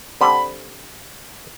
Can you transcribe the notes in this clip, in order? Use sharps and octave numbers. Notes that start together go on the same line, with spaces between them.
D3 G3 C4 G4 B5